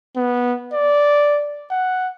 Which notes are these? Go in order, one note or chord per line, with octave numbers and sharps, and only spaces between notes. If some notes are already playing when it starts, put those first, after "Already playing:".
B3
D5
F#5